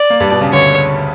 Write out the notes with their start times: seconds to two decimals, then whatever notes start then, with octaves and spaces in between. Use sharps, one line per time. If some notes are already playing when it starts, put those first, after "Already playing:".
Already playing: D5
0.10 A#3
0.20 G2 G3
0.31 B2
0.41 C#3
0.53 D2 D3 C#5